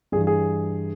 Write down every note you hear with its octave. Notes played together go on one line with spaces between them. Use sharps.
G2 E3 G#4
G#4